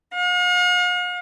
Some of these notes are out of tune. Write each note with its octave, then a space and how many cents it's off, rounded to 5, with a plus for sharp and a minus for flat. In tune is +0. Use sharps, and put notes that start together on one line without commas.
F5 +45